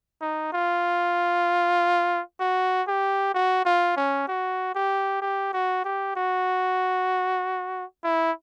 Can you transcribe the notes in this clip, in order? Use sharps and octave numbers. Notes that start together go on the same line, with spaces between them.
D#4
F4
F#4
G4
F#4
F4
C#4
F#4
G4
G4
F#4
G4
F#4
E4